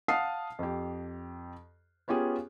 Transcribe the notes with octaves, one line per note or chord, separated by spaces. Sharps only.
F5 F#5 A5 D#6 F6 C7
F2 G4
B3 C#4 F4 G4 G#4